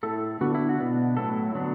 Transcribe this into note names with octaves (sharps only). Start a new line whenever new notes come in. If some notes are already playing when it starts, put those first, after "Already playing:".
A2 A3 E4 A4
D3 B3 D4 F#4
E4
F#4
B2 B3 D4
A2 F#3 A3 E4 A4
D3 F#3 B3 D4